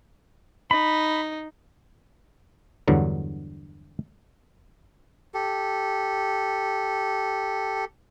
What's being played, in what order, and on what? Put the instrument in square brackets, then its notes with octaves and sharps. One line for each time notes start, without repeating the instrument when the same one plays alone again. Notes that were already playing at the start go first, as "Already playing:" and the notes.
[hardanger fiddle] D#4 [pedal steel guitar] B5
[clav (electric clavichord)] E2 G2 D3 F#3
[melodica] G4 A4